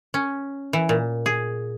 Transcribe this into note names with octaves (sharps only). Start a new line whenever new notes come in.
C#4
E3
A#2
G#4